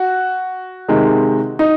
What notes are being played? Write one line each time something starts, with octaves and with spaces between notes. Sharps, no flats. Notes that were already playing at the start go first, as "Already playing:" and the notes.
Already playing: F#4
C3 D#3 G#3
D#4